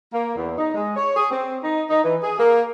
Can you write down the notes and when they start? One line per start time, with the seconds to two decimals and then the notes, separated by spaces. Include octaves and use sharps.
0.13 A#3
0.36 E2
0.58 D#4
0.74 G#3
0.96 C#5
1.16 G#4
1.31 C4
1.63 D#4
1.89 D#4
2.04 E3
2.23 G#4
2.39 A#3